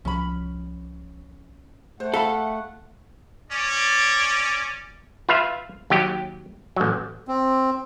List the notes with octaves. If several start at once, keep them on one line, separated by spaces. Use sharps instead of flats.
C2 F3 C#4 B5
A3 C5 F#5
A4 E5 F5 B5
C#4 D5
F4 B4 E5 F5
D#2 F#3 G4 G5
A1 F#3
C4